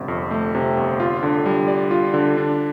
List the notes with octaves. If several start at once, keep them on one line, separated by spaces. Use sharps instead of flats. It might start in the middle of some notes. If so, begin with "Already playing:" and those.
Already playing: G1 C3
F2
A3
C3
G1
F4
D3
G3
D5
F4
D3
D4